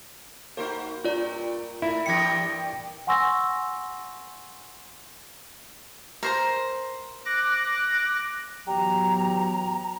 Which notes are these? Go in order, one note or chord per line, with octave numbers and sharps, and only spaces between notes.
A#3 D#4 F#4 C5
G2 F4 D5
A3 E4
G2 E3 G4 D5 G5 A#6 C#7
F#5 G#5 C6 C#6 E6 A#6
A#4 C5 A#5
D6 F#6 A#6
E3 F#3 B3 G4 A#5